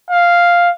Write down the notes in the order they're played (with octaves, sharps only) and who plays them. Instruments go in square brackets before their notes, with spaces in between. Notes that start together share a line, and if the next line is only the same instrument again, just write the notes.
[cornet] F5